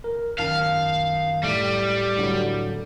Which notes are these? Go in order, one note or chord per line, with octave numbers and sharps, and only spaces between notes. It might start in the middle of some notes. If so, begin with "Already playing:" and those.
A#4
F#2 D#3 F5 A5
A2 G3 A3
A2 D3 F#3